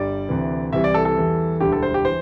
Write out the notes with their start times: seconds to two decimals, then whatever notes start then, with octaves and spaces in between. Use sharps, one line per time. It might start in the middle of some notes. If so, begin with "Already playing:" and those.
Already playing: G1 G2 G3 D5
0.29 D2 C3 E3
0.73 C2 C3 E3 G3 E5
0.84 D5
0.94 A4
1.05 A4
1.17 E2 E3 G3
1.60 E1 D2 D3 G3 G4
1.72 A4
1.83 C5
1.94 G4
2.05 E3 C5